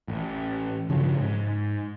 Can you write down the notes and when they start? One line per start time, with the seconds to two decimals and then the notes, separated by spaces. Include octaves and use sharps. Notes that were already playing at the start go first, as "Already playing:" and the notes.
0.08 A1
0.89 G2 C#3 F3 F#3
1.19 G#2